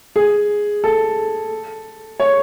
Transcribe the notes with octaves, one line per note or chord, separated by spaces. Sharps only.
G#4
A4
C#5